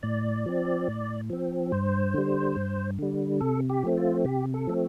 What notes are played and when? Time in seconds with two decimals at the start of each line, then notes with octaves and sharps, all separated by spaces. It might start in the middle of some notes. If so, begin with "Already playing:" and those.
0.03 A2 D5
0.46 F3 C4
0.88 A2
1.30 F3 C4
1.72 G2 C5
2.14 D3 G3
2.56 G2
2.99 D3 G3
3.41 C3 A4
3.70 G4
3.83 F3 A3 C4
3.98 F4
4.25 C3 G4
4.54 A4
4.67 F3 A3 C4